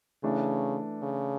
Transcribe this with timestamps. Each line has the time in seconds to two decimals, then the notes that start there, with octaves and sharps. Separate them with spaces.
0.23 C#3 E3 A3 D4
1.02 C#3